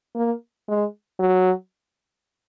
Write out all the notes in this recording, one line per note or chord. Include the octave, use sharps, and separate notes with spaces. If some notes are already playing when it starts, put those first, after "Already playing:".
A#3
G#3
F#3